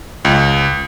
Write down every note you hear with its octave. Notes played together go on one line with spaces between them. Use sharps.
C#2